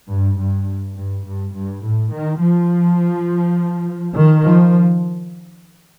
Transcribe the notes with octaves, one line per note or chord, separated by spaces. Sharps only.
G2
G2
G2
G2
G2
A2
D#3
F3
D#3
F3